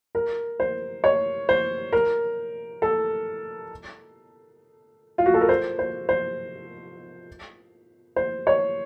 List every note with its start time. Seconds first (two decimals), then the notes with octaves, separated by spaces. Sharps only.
0.15 A#4
0.60 C5
1.04 C#5
1.49 C5
1.93 A#4
2.82 A4
5.18 F4
5.26 F#4
5.34 A4
5.41 A#4
5.49 C5
5.79 C5
6.09 C5
8.16 C5
8.47 C#5